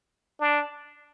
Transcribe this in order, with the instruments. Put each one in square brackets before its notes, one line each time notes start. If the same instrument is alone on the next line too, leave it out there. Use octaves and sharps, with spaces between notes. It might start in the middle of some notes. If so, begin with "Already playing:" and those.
[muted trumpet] D4